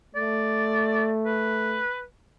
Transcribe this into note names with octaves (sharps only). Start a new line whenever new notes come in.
A3 D5
B4